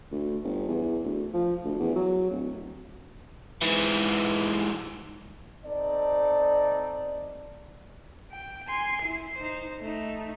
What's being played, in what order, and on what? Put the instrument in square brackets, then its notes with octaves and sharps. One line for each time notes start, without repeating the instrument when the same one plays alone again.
[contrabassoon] D2
G1
E2
D2
F3
D2
E2
F#3
D1
[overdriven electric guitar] G#2 E3
[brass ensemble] C4 D#4 A4 D5
[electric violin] G5
G#5 C6
E4 C7
D#4 C5
A3 D#4